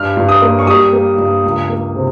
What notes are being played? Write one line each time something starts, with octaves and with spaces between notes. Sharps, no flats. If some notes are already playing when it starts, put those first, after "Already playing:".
Already playing: G2 F6
G2
D#6
A#3
C#6
G3 D#6
A#3
G2
C#2
A#3
C3